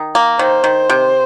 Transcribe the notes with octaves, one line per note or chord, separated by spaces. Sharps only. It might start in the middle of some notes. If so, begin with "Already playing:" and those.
Already playing: D#3
A#3
D#3 C5
D#3
C3